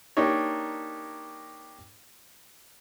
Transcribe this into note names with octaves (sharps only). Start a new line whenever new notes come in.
A#3 D4 D#4 G4 C#5